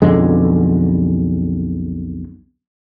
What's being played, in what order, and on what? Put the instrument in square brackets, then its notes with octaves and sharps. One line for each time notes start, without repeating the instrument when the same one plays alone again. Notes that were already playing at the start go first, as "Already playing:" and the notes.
[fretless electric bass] B1 F2 D3 G#3